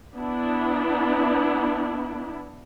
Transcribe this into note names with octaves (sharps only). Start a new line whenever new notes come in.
B3 D4 E4